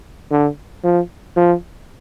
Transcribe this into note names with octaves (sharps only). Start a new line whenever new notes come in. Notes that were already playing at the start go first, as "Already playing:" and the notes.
D3
F3
F3